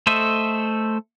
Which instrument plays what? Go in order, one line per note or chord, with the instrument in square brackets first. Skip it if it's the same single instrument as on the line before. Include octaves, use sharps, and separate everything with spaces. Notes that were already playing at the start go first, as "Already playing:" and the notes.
[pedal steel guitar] A3 A4 C5 D#5 E5